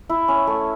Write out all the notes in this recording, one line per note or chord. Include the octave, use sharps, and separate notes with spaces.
E4
C#4
A3